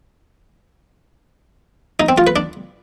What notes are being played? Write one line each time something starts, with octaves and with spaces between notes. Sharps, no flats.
D#4
C4
F4
B4
D4